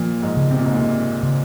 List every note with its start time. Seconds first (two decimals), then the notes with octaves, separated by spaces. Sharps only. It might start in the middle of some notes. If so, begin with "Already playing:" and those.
Already playing: A#2 F3
0.22 G#2
0.37 C#3
0.51 C3
0.58 A#2
0.66 G#2
0.73 A#2
0.80 C4
1.23 C#3